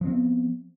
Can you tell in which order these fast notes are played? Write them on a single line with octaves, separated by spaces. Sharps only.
F3 C4 B3